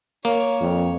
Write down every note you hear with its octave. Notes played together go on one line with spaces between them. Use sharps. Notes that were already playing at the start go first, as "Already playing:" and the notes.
A#3 C#5
F2